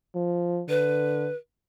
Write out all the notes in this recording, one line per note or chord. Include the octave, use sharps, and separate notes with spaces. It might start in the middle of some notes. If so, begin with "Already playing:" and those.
F3
D3 B4